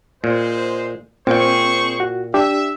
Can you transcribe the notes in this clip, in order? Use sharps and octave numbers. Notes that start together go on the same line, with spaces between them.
A#2 G#3 C5
A#2 C4 G#4 C5 G5 C#6
F#4
D4 G4 E5